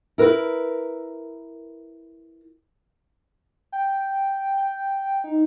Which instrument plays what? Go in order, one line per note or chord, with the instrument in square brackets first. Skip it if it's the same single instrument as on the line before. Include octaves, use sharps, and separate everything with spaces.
[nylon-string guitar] E4 A#4 B4
[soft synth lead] G5
G5
D#4